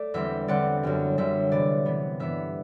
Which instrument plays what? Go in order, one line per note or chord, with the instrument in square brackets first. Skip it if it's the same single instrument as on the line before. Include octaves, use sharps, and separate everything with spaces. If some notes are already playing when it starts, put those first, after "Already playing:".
Already playing: [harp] A3 D5
E2 D3 G3 C4 E5
E2 D3 G3 C4 D5 F#5
F#2 D3 G3
F#2 D3 G3 E5
C3 E3 B3 D5
C3 E3 B3
G2 E3 B3 E5